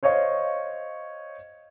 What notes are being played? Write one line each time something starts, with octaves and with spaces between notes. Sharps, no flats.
C5 C#5 D#5 F5 C#6